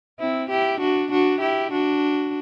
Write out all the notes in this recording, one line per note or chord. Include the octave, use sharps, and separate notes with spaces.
C4 E4
E4 G4
D4 F#4
D4 F#4
E4 G4
D4 F#4